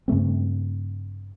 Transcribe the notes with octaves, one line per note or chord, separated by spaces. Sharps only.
G2 C#3 A3 C4